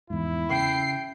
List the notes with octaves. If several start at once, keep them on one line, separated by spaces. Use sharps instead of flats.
E2 G#2 E4
C#3 G5 C7